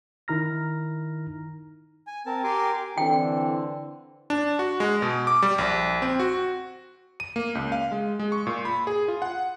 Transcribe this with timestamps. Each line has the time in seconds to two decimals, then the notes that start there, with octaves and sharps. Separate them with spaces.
0.28 D#3 D#4 E4 A#5 F6 A#6
2.07 G#5
2.26 C4 A#4 A5
2.44 G4 A#4 G#5 C6 D6
2.98 D3 E3 C4 G5
4.30 D4
4.59 F#4
4.80 G#3
5.02 B2
5.27 D6
5.42 G3
5.58 A#1
6.02 C4
6.20 F#4
7.20 D#7
7.36 A#3
7.55 C#2
7.72 F5
7.92 G#3
8.19 G#3
8.32 C#6
8.47 A#2
8.65 B5
8.87 G#4
9.08 F4
9.22 F#5